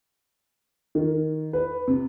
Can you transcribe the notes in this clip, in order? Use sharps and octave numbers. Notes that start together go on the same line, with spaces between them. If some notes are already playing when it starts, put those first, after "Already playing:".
D#3
B4
C3